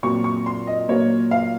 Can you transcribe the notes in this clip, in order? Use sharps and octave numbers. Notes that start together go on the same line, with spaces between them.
A#2 F#3 C4 C#6
C#6
C6
D#5
A#2 F#3 A#3 C#5
F5